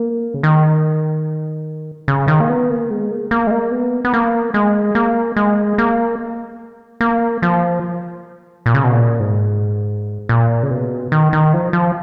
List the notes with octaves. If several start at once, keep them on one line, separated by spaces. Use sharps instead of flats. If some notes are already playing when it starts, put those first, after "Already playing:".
Already playing: A#3
C#3
D#3
C#3
D#3
A#3
B3
A#3
G#3
A#3
A#3
G#3
A#3
B3
B3
A#3
G#3
A#3
G#3
A#3
A#3
F3
A#2
C#3
B2
A#2
G#2
A#2
C#3
B2
D#3
D#3
F3
F3